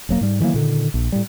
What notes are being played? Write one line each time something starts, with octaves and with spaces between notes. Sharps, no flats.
D#1 F#3 A#3
G#2 G3
D#3 E3 F#3 A#3
A#2 D3 D#3
A#1
A2 G3